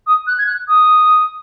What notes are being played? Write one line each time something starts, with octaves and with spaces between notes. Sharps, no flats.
D#6
F#6
G#6
F#6
D#6